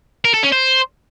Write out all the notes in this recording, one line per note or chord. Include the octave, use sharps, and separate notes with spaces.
A#4
A4
C#4
C5